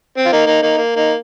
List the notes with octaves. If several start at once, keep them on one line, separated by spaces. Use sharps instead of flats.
C4
F4
A#3 D#4
A#3 D#4
A#3 D#4
A#3
A#3 D#4